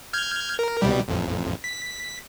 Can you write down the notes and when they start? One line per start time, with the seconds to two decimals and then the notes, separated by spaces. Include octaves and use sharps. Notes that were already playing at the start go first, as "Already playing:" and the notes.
0.13 F6 G6 G#6
0.59 A#4
0.82 C2 B2 G3
1.08 A1 F2
1.64 B6